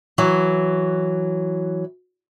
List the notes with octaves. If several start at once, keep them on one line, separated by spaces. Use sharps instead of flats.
E3 F#3